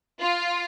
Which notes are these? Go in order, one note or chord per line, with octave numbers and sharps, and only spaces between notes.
F4